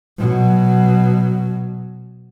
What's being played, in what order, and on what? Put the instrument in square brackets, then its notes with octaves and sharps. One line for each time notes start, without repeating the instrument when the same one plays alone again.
[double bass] B2 F#3